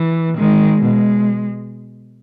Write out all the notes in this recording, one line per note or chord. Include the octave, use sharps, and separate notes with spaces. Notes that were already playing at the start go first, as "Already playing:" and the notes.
Already playing: E3
D#3 G#3
B2 G#3